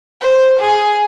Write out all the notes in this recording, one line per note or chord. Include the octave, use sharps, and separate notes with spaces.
C5
G#4